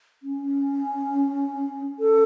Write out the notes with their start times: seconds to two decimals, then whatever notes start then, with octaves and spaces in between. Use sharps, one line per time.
0.23 C#4
2.00 A4